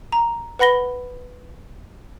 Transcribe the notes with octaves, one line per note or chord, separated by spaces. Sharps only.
A#5
B4 F#5 B5 A#6 G7